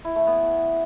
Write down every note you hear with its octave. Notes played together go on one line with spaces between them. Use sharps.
E4
A3
B3